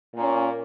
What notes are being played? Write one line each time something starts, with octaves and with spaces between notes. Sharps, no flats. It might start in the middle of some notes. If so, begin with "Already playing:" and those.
A#2 A#3 C#4